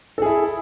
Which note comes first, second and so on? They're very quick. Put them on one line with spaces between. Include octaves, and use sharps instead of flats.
A4 G#4 E4